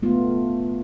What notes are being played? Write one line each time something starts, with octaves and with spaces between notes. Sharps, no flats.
A3 B3 F4